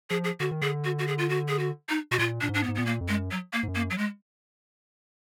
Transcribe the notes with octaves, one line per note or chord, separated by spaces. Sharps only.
F3 G#4
G#4
D3 F#4
D#3
D3 G#4
F#4
F#4
G#4
F4
F#4
G#4
F#4
D#4
B2 F#4
A#2 F4
A#2 D4
G#2
D4
B3
G#2
A#2 B3
A#3
F2
F#2 G#3
F#3
A#3
G#2
F#2
A#3
F#3
G#3